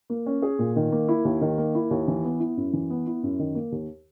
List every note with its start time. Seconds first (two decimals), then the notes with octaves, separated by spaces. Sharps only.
0.10 A#3
0.26 C#4
0.42 G#4
0.59 A#2
0.76 D#3
0.92 A#3
1.08 E4
1.25 D#2
1.41 D#3
1.58 A#3
1.75 E4
1.91 D#2
2.08 E3
2.24 B3
2.40 E4
2.57 F#2
2.73 E3
2.90 B3
3.07 E4
3.23 F#2
3.39 D#3
3.55 A#3
3.72 D#2